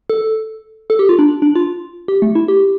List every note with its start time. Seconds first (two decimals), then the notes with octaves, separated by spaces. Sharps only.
0.10 A4
0.90 A4
0.99 G4
1.09 F4
1.19 D4
1.42 D4
1.55 F4
2.08 G4
2.22 A3
2.35 E4
2.48 G4